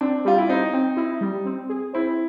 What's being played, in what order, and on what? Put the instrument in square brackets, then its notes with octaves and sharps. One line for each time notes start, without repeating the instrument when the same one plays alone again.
[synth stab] C4 [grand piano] D4
[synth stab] G3 [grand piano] F4
[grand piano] E4
[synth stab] C4 [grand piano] D#4
[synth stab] C4
E4
G3
C4
G#4
[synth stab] C4 [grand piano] E4